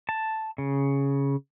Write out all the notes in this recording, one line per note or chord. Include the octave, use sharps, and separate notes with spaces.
A5
C#3